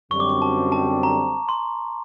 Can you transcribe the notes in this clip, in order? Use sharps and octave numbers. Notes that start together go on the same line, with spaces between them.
F#2 D3 G3 C4 C#6
D6
C#6
A5
A5
A#5
C6